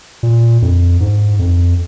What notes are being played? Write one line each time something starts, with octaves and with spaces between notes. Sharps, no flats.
A#2
F2
G#2
F2